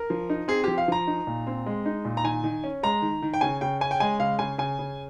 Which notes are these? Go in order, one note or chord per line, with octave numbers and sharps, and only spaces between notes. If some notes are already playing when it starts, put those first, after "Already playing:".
Already playing: A#4
F3
D#4
C4 G#4
F3 G4
F5
F3 A#5
D#4
A#2
C4
G#3
D#4
A#2
A#5
D#3 G#5
D#3
C#4
G#3 A#5
D#3
D#3
G5
C#3 G#5
C#3 G5
C#4 G#5
G5
G#3 G#5
C#3 F5
C#3 G#5
C#3 G#5
C#3